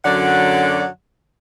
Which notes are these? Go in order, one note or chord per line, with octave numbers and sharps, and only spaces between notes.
F#2 D3 F#3 D5 F#5